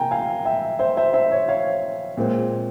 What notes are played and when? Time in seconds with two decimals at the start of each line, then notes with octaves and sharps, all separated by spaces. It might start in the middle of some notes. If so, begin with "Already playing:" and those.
Already playing: C3 A#3 G5 G#5 A#5
0.11 F5 G#5
0.45 E5 G5
0.79 C5 E5
0.97 C5 E5
1.14 C5 E5
1.32 C#5
1.48 C#5 F5
2.17 A#2 G#3 C4